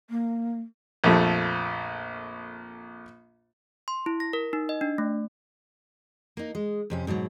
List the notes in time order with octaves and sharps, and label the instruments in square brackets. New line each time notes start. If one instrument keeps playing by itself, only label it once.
[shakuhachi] A#3
[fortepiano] A#1 F2 F3 A3
[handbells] C6
E4
A#6
A#4
D#4
D#5
D4
A3
[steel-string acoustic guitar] A#3 D#4
G#3
F2 C3 C#4
G#2 B2 D#3 F#3